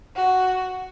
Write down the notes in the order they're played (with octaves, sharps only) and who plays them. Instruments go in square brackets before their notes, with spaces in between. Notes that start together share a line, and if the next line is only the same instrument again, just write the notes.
[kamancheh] F#4